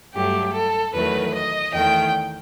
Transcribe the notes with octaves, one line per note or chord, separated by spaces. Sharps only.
G2 F#3 A3 G4
A4
E2 D#3 F#3 A3 B4
D#5
E2 D#3 A3 G5